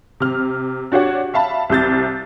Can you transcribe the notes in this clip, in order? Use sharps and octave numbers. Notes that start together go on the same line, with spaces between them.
C3 F6
D4 F#4 G4 C#5 F#5
E5 F5 A5 B5
C2 C3 G6 A6